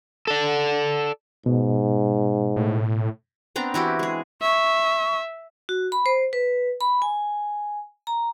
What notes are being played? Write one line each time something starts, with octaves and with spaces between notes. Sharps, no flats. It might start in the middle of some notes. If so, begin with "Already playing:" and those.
A4 D5
G#2 B2
A2
B3 C4 D4 A#5
E3 E4 F#4 G4
G#3 G#4
E5 C#6
F#4
B5
C5
B4
B5
G#5
A#5